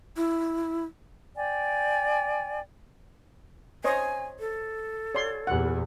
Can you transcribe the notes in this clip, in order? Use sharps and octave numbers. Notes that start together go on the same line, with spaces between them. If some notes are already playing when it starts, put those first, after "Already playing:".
E4
D5 G5 G#5
C5 C#5 D#5 G#5
A4
C#5 D5 C6
E2 A#2 G4 F#5